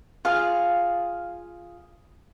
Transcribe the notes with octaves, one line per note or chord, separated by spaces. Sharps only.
F4 G#4 F5